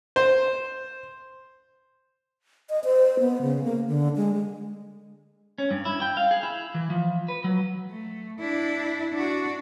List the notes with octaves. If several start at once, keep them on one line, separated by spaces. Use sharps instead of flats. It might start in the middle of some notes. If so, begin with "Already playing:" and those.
C5
D#5
C5
B3
C#3
A#3
D3
G#3
G#3
C#4
G2
E4
G5
F5
G#4
E4
E3
F3
B4
F#3
A3
D4 E4
D4 F#4